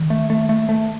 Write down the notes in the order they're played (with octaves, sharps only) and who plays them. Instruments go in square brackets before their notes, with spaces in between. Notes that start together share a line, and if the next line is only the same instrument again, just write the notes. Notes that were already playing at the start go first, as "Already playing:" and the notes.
Already playing: [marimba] D#3
[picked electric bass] A3
A3
A3
A3